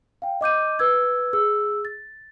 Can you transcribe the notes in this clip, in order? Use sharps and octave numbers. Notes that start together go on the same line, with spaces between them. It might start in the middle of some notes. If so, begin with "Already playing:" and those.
F5 G5
D#5 D6 G6 D#7
B4 E6 G#6
G#4 E6
A6